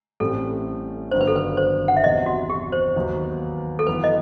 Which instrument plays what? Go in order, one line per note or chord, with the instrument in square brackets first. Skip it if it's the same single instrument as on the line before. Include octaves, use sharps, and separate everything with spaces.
[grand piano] A1 A2 G3 C4 [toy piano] A4
[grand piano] G1 G2 D#3 F#3 B3 [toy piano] C5
[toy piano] B4
A4
B4
C5
F#5
E5
[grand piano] E2 C3 F#3 [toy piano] D#5
[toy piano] F#4
G4
C5
[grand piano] D#2 D#3 F#3 B3 D#4
[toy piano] A4
[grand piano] F#2 E3 B3 [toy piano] B4
[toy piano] D#5